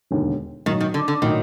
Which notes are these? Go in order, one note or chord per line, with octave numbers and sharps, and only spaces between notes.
E1 D#2 D3
B1 A2 D#3 F#3
D#3
D3
D3
A2 D#3 F#3